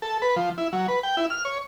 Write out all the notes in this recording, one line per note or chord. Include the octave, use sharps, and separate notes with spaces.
A4
B4
F3
E4
F#3
B4
G5
E4
F6
C#5